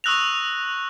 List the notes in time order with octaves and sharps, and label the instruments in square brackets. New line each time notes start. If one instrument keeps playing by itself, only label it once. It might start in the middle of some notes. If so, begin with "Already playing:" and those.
[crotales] C#6 D#6 E6 F#6 A#6 F7